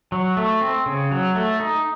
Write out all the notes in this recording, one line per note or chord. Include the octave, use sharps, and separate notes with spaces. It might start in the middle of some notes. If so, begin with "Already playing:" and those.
F#3
A3
C4
C#3
F#3
A3
D#4